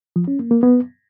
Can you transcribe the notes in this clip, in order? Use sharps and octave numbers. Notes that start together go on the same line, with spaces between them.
F3
C#4
A#3
A#3
B3